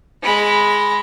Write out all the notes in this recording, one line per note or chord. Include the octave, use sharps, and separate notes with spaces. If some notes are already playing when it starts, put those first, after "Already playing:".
G#3 B5